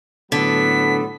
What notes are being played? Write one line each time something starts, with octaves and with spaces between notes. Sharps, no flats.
A2 D3 F#3 B3 A4 B6